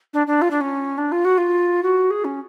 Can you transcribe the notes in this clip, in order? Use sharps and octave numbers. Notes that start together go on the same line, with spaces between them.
D4
D4
F4
D4
C#4
D4
F4
F#4
F4
F#4
G#4
C#4